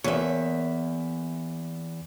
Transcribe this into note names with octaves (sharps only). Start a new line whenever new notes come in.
E2 A#3 C#5 E5